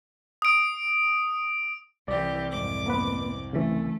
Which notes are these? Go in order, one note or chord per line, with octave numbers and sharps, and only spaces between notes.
D#6 D7
C2 E3 G4 D5
F2 G#2 D6
A#3 B3 B4
C#3 E3 A3